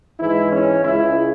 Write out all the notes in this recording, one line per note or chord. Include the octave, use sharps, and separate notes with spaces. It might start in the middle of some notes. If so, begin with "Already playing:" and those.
G#2 E3 G#3 E4
C#4
C#2 C#3 G#3 E4